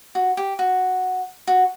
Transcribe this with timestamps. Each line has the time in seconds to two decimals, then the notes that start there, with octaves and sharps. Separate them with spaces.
0.15 F#4
0.37 G4
0.59 F#4
1.47 F#4